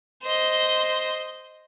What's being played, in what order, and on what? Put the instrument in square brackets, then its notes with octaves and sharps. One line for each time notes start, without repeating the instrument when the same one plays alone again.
[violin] C5 D#5